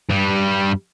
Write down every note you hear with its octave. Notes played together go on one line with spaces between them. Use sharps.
G2 G3